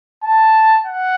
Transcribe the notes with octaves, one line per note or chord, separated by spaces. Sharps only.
A5
F#5